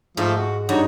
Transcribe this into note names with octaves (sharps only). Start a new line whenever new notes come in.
G#2 F3 A3 F4
F#4
G2 D#4 F#4 C#5